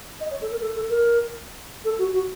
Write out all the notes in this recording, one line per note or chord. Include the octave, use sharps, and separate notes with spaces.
D#5
C#5
A4
A#4
A4
A4
A#4
A4
F#4
F#4